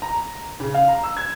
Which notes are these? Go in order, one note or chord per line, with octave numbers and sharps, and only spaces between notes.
A#5
C#3
F5
A#5
E6
G#6